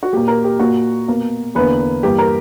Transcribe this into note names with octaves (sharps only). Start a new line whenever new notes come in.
F#4
A#2 A#3 G4
A#4
G4
A#2 A#3 F#4
B2 A#3
E2 D3 A#3 B4
G2 E3 A#3 G4
A#4